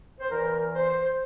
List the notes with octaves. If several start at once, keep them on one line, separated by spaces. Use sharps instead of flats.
C5
E2 E3 A#4
C5